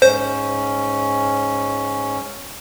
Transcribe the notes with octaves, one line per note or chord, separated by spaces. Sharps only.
G#2 C#4 C5